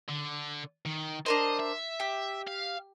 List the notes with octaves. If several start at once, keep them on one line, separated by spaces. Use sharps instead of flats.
D3
D#3
D4 A#4 C5 D#5
E5
G4
F5